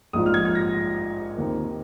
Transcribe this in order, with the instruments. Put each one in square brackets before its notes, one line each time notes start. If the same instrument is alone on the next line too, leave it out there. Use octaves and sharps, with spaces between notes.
[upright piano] A#1 G#2 F3 D#6
F6
G#6
G#6
A#6
D#2 D#3 C4 D#4